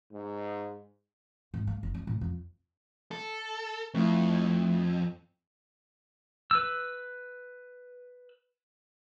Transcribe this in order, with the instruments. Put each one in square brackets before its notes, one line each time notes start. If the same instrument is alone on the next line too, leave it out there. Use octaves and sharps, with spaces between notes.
[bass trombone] G#2
[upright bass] G#2
A#3
F#1
D4
A2
F2
[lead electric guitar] A4
[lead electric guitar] F2 [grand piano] A3 E4
[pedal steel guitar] B4 E6